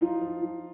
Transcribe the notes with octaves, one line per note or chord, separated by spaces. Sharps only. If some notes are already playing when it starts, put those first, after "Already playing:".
F3 D#4 F4
F3
F3